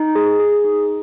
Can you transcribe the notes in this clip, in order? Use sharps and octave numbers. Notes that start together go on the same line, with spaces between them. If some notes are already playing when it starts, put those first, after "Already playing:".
Already playing: D#4
G#4
G#4
D#4